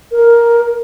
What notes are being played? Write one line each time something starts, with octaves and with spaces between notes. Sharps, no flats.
A#4